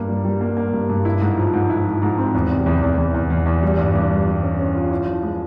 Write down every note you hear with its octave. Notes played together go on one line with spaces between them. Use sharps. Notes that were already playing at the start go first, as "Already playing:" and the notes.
Already playing: G2 A#3
G3
G3
A#3
A#3
G2
G2
E4
G#2
F3
G#2
E4
F3
G#2
C4
E2
C3
E2
E2
E2
E2
E2
E2
G3
G2
G2
G3
G3
C#4
C#4
F4
E4
F3
G#3